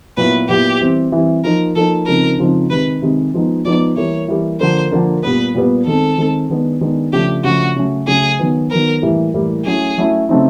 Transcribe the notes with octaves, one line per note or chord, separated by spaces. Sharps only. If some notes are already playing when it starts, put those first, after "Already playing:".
A#2 F#3 B3 E4 B4
A#2 F#3 B3 E4 G4
E3 G3 C4
E3 G3 C4
F3 A#3 D#4 A#4
F3 A#3 D#4 A4
C#3 F3 G#3 C4 D#4 A#4
C#3 F3 G#3 C4 D#4
C3 D#3 G#3 B4
C3 D#3 G#3
F3 G#3 B3 D#4
F3 G#3 B3 D#4 D5
E3 G3 A#3 C#5
E3 G3 A#3
D3 F3 A#3 D4 C5
D3 F3 A#3 D4
A#2 G3 B3 B4
A#2 G3 B3
D#3 G#3 C4 A4
D#3 G#3 C4
D#3 G#3 B3 D4
D#3 G#3 B3 D4
C#3 F3 A3 D4 G4
C#3 F3 A3 D4 F#4
C#3 F#3 A3 C#4
C#3 F#3 A3 C#4 G#4
D#3 F#3 B3
D#3 F#3 B3 A#4
A2 E3 G3 A#3
A2 E3 G3 A#3
F#3 A3 C#4 E4 G#4
F#3 A3 C#4 E4
C#3 F#3 A3 C4 D#4